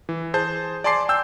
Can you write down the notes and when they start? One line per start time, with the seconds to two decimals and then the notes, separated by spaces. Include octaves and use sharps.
0.09 E3
0.34 G#4 C5 A5 G6
0.84 D5 G#5 A5 C6 D6 C7
1.09 G5 E6 G6